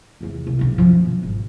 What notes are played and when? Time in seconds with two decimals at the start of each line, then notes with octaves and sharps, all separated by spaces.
0.21 F1 E2
0.47 C2
0.59 E1 B1
0.78 F#2 F3
1.05 B2
1.23 G#1